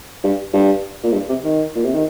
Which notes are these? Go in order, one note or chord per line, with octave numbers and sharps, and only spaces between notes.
G2
G2
A#2
G2
C3
D#3
A#2
C3
D#3